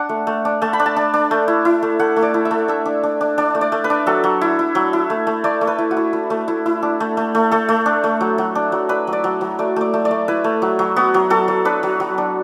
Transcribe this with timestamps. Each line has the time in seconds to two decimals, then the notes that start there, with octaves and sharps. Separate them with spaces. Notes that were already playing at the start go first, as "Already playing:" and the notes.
Already playing: D4 F#5
0.09 A3
0.27 A3
0.45 D4
0.62 A3 A5
0.73 B5
0.79 D4
0.86 A5
0.96 D4
1.14 D4
1.31 A3
1.48 E4
1.65 E4
1.83 A3
1.99 A3 F#5
2.16 A3
2.23 D5
2.34 E4
2.45 E5
2.51 A3
2.68 D4 E5
2.85 D4
3.03 D4
3.21 D4
3.38 D4 D5
3.55 A3
3.61 D5
3.72 A3
3.84 B4
3.90 D4
4.06 F#3 A4
4.24 F#3
4.41 E4
4.59 E4
4.75 F#3
4.93 E4
5.10 A3
5.27 A3
5.44 A3 D5
5.61 A3
5.67 B4
5.78 E4
5.91 F#4
5.97 E4
6.13 E4
6.30 A3
6.48 E4
6.66 E4
6.83 D4
7.00 A3
7.17 A3
7.35 A3
7.51 A3 A4
7.69 A3
7.86 D4
8.04 A3
8.21 F#3
8.38 F#3
8.55 D4
8.72 F#3
8.89 D4 B4
9.07 F#3
9.13 D5
9.24 F#3
9.41 F#3
9.59 A3 D5
9.76 A3 D5
9.94 A3
10.05 D5
10.11 A3
10.28 E4 B4
10.44 A3
10.62 F#3
10.79 F#3
10.96 B3 F#4
11.14 F#3
11.30 F#3 A4
11.48 F#3
11.65 D4 B4
11.83 F#3
12.00 F#3
12.18 D4